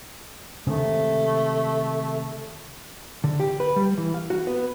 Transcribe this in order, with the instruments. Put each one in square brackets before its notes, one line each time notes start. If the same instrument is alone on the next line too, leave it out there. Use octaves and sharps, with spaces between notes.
[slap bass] C3 D#3 G#3 [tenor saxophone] A3
[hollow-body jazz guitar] D3
G4
B4
G3
E3
F5
F#4
B3